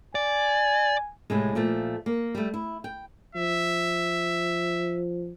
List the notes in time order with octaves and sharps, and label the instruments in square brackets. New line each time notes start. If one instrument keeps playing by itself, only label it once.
[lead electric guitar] D5 [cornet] G#5
[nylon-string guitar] A2 C3 G#3
A#2 F3 A3
A#3
G3 A3
E4
G5
[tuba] F3 [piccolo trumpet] E5